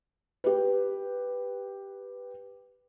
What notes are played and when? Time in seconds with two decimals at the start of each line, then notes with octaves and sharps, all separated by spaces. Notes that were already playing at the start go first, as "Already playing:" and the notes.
0.44 G4 B4